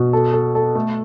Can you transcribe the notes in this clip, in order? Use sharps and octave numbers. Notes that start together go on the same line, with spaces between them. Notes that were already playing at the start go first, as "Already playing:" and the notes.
Already playing: B2
A4
A4
A4
A3